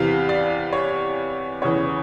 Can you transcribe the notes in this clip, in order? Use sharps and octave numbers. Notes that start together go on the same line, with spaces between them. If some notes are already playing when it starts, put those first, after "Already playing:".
Already playing: E2 C3 E3 F5
D5
C#5
E2 C#3 E3 C#5